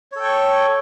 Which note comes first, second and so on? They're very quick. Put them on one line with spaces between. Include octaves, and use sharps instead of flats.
C#5 A4 G5 C#6